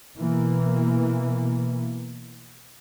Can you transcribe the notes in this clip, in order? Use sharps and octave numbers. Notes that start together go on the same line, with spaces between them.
B2 E3 A#3